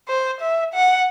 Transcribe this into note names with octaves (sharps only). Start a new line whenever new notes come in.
C5
E5
F#5